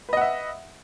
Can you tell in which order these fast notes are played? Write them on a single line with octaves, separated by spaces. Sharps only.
B4 D#5 F#5 E5